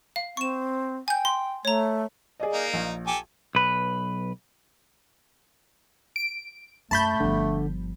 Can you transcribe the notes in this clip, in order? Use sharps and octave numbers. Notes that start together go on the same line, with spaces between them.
F5
C4 C#6 E7
G5 G#5 G6
C6
A3 C#5 A#5
G#4 D5 D#5
A#3 D#4
A#1
G4 A4 G#5
B1 B4
D7
F#2 G#3 A3 A5 B5 G6
G1 D3 F3